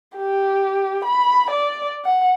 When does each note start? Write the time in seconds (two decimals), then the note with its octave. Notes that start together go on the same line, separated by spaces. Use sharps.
0.17 G4
1.05 B5
1.51 D5
2.05 F#5